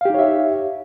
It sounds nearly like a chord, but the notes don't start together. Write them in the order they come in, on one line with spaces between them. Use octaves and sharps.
F5 G4 D#4 C#5 E5